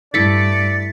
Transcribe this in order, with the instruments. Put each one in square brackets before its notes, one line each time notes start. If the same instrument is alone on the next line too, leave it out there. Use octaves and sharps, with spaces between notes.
[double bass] G2 [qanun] A3 E4 [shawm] D5 [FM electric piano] A6 B6 C#7